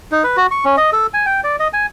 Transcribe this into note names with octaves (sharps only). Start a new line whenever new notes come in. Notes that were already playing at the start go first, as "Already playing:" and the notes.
D#4
B4
F#4
C#6
C#4
D#5
A4
G#5
G5
D5
D#5
G#5